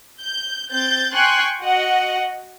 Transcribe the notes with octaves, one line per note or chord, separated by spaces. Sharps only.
G6
C4 G6 A6
G5 G#5 C6 C#6 F#6
F#4 D#5 F#5